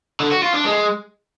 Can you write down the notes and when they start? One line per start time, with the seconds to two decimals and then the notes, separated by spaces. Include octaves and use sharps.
0.20 D3
0.31 F#4
0.42 F4
0.54 D4
0.65 G#3